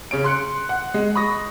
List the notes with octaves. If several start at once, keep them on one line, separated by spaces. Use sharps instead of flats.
C#3 C#4 D7
C6 F#6 C#7
F#5
G#3
B5 C#6 D#6 A#6